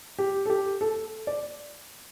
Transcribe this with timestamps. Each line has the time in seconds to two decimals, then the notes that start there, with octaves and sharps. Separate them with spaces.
0.19 G4
0.46 A4
0.50 G4
0.81 A4
1.27 D5